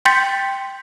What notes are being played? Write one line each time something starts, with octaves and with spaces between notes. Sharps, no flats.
G5 C6 G6 A6 B6 C#7